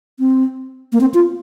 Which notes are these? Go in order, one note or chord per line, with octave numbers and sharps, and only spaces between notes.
C4
A#3
C4
F4